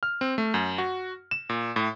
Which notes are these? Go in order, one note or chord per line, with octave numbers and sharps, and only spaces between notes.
F6
C4
A3
F#2
F#4
E7
A#2
A2